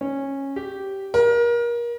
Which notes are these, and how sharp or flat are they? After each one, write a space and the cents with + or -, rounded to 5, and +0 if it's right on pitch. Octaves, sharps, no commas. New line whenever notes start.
C#4 -15
G4 -10
A#4 +30